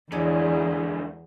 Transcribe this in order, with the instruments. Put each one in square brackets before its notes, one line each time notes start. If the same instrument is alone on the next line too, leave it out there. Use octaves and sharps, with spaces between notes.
[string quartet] E2 [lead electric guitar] G#2 D3 [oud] E3 C#5 D5 [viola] E4 G#4